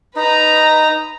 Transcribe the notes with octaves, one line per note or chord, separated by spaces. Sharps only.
D#4 B4 A#5